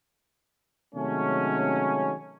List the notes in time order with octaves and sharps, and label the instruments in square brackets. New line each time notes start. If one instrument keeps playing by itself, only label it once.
[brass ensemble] C3 D#3 F#3 G#3 A3 C#4